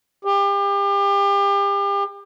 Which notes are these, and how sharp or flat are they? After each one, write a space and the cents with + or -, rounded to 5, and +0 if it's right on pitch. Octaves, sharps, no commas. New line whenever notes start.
G4 +35